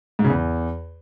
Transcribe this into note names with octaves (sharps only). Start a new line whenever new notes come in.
G#2
C#3
E2